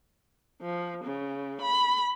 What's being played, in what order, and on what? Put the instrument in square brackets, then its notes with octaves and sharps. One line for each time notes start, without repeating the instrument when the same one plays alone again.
[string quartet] F3
C#3
B5